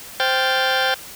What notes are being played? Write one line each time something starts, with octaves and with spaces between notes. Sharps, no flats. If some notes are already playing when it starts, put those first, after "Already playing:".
C5 G5 F6 G6 A6